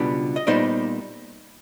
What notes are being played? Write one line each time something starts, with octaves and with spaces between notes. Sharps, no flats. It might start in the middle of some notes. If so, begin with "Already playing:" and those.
Already playing: C#2 B2 G3 B3 D4
D#5
A#2 G3 B3 D#4 C5 D5